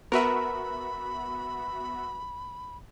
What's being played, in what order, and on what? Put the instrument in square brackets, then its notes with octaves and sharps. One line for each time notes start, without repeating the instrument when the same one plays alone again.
[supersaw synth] B3 F#4 E5 [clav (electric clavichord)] A#4 B4 [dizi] B5